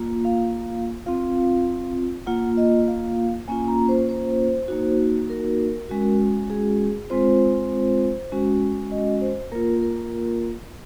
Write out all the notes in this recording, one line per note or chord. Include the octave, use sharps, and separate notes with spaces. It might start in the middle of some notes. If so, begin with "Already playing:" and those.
Already playing: A#3 F4
F5
C4 F4 F5
A#3 F4 F#5
D#5
F5
A#3 C#4 F4 G#5
A#5
C5
C5
A#3 D#4 F#4
A#4
G#3 C#4 F#4
G#4
G#3 C4 F4 C5
G#3 C#4 F#4
D#5
C5
A#3 F4 A#4
A#4